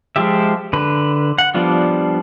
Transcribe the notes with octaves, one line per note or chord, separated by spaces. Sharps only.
F3 G#3 F4 G4 E5
D3 B4
F#5
F3 G3 B3 D4 F4